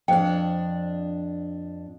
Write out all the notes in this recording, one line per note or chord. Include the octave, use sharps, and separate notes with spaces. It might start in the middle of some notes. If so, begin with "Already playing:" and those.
F2 D4 C5 G5